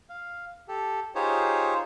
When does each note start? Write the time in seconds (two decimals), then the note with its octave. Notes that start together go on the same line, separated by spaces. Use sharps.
0.09 F5
0.68 G4 A4
1.15 D#4 F4 G4 G#4 C5 C#5